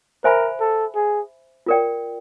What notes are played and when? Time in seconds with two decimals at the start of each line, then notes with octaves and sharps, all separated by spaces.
0.24 A#4 C5 E5 G#5 B5
0.61 A4
0.96 G#4
1.66 F4 A#4 D5 G5